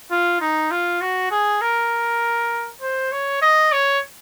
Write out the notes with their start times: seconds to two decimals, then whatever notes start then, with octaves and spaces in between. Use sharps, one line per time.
0.11 F4
0.41 D#4
0.71 F4
1.01 F#4
1.31 G#4
1.61 A#4
2.82 C5
3.12 C#5
3.42 D#5
3.72 C#5